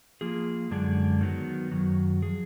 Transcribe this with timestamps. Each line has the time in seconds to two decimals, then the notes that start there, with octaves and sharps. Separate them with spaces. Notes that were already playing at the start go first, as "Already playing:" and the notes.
0.21 F3 A#3 F4 G#4
0.71 F#2 D3 G#3 D4 G#4
1.21 D#3 F#3 B3
1.72 F#2 D#3 F#3
2.22 F3 G#4